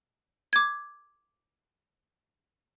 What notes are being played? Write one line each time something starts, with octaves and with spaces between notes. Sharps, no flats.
D6 G#6